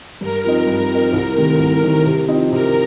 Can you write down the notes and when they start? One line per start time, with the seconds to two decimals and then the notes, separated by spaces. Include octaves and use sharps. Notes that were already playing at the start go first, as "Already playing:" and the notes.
0.21 G2 A#4
0.44 F3 C4 D#4
0.67 G2
0.90 F3 C4 D#4
1.13 C2 A#4
1.36 C3 D#3 A3 C4
1.59 C2 A#4
1.82 C3 D#3 A3 C4
2.05 C3
2.28 F3 C4 D#4
2.52 C3 A#4